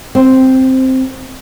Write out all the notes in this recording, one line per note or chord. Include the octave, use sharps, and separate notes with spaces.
C4